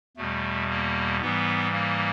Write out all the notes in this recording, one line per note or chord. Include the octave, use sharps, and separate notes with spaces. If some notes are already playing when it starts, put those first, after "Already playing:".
E2 B2 G3 A3
A#3
G#2 E3 G3 B3
A#3